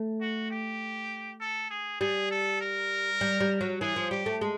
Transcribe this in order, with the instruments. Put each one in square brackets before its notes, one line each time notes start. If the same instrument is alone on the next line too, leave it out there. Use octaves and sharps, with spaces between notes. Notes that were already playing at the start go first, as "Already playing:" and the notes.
Already playing: [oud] A3
[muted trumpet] F#4
G4
A4
G#4
[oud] G3 [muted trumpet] G#4
[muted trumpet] A4
A#4
[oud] G3
G3
F#3
[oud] E3 [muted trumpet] G#4
[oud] F3
[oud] G3 [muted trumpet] G4
[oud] A3
G#3